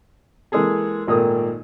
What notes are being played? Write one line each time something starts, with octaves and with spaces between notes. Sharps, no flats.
E3 G#3 A#3 G#4 A4
G#1 A#2 D#3 A3 A#3 D#6